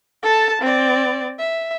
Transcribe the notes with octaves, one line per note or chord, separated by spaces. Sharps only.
A4 A5
C4 D5
E5